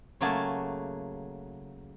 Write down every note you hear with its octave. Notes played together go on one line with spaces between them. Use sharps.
C#3 F#3 A3 A#3 G#4 A5